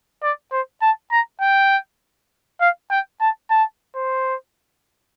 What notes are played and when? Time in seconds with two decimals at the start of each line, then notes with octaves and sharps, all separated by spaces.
0.23 D5
0.52 C5
0.82 A5
1.11 A#5
1.41 G5
2.61 F5
2.91 G5
3.21 A5
3.50 A5
3.95 C5